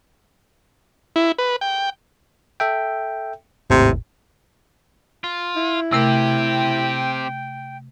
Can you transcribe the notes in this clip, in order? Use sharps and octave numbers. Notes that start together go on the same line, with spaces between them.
E4
B4
G5
A4 E5 G5
G#1 D#2 A2 C3
F4
E4
C3 A3 C4 G4 A#4 G5